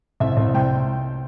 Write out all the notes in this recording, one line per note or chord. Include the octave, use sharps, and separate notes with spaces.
C2 E5
C2
C3 G5